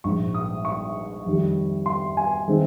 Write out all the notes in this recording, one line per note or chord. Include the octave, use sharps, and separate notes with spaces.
A#1 G#2 F3 C#6
D#6
C#6
F2 D#3 G3
C6
G#5
D#3 G#3 C4